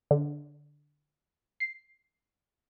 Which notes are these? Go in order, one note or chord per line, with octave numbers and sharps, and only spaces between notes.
D3
C7